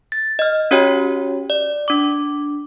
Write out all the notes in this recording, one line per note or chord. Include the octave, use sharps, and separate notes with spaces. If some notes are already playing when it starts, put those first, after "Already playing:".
A6
D#5 F6
C#4 F#4 G4 C#5 G5
D5
D4 D6